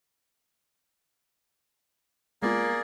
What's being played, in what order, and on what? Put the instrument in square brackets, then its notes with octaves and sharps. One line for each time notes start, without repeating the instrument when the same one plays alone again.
[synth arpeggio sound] G#3 B3 F4 [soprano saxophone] A#3 [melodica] G#4 D5